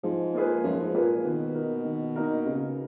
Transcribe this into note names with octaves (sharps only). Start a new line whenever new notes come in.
G#2 F3
A#3 F4 G#4 B4
F#2 F3
G#2
A#2 A#3 F4 G#4 B4
B2 D#3
A#3 D#4 A#4
D#3
A#3 D#4 A#4
C#3